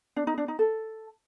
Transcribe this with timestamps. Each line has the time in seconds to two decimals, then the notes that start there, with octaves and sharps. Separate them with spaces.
0.16 D4
0.27 D#4
0.38 D4
0.48 D#4
0.59 A4